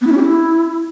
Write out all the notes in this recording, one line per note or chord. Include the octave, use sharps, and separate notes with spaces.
B3
E4
C#4
G4
E4